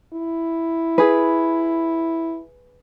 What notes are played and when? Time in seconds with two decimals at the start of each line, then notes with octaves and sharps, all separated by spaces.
0.13 E4
0.98 G#4 B4